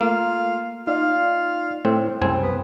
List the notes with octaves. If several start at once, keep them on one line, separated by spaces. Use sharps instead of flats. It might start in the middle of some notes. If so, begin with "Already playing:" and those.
A3 A#3 F4
D#4 F4 D5 F5
A2 A3 C4
C2 F#2 C#3 C4 G#5
B3